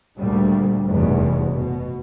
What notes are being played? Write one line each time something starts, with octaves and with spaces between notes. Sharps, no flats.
D2 A#2 G3
F1 E2 G2 B2
B2